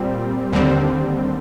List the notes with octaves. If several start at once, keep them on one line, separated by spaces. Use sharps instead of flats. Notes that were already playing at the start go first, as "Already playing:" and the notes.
Already playing: A#2 G3 C4
D#2 D3 G3 C4